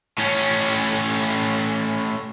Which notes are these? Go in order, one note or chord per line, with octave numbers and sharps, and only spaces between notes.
A2 C#4